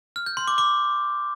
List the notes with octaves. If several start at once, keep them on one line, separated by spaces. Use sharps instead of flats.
F6
G6
C6
D6
D6